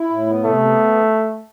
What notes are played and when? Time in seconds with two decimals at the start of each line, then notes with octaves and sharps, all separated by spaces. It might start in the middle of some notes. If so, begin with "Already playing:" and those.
Already playing: E4
0.10 A2
0.27 B3
0.44 C3 A3
0.61 B3